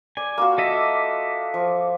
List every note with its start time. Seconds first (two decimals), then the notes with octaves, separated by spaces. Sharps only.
0.17 D5 G#5
0.38 A#3 F4 F#4
0.58 A4 D#5 E5
1.54 F3